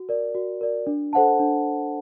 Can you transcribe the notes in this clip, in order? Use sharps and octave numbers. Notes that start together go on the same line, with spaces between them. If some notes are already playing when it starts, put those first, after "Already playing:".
Already playing: F#4
A#4 D5
F#4
A#4 D5
D4
A4 C5 F#5 A5
D4